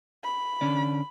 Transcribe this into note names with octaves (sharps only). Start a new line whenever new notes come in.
B5
D3 C#4 D5